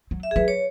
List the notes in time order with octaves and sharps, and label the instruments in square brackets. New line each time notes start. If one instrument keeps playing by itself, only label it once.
[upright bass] F#3
[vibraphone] E5
G#4
[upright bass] F#3 [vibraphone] B4
[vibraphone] C#5